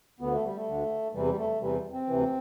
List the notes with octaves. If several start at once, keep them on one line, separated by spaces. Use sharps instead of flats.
D2 D3 B3
A3
G3
A3
D2 D3
E2 C3 E3 G3
G3
A3
E2 C3 E3 G3
C4
D2 C3 E3